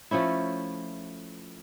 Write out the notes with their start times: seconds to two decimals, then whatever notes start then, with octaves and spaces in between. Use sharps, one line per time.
0.11 F3 A3 C#4 E4